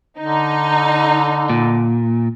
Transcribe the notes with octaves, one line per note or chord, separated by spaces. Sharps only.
D3 D#4
A#2